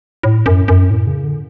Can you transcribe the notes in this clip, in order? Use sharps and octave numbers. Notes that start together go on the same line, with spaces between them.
A2
F#2
F#2
A2
C#3
D3